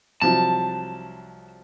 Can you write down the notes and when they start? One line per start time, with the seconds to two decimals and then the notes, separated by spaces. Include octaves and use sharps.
0.21 C2 F3 F#3 A5